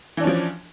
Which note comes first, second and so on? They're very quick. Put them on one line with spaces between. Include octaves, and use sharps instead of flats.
E3 D4 C#4 F3